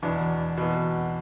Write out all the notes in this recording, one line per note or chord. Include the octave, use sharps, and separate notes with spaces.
E2 B2 D4
E2 B2